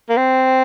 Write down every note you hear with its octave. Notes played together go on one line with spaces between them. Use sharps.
A#3
C4